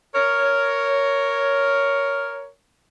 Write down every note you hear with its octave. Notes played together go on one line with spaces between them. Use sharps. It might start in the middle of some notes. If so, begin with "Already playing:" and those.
A#4 C#5